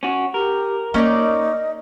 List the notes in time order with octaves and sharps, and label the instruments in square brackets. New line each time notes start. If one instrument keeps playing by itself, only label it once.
[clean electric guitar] C#4 F#4
[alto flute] G4 [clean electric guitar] A#4
[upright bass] A#3 [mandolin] C#4 D#4 D5 [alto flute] D#5